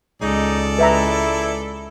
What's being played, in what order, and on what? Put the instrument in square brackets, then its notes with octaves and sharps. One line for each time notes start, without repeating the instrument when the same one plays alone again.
[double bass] C#2 G#3 [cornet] D#4 [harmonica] A4 D5
[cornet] E4 [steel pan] B4 E5 A#5